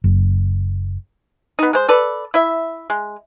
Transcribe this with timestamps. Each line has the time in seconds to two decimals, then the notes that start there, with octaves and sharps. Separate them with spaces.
0.04 F#1
1.59 B3 D#4
1.73 G#3 C5
1.88 A4 B4 D5
2.34 E4 E5
2.90 G#3